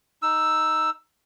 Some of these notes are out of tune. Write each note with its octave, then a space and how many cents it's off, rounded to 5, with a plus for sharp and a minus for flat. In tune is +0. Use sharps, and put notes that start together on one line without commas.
D#4 +0 E6 +0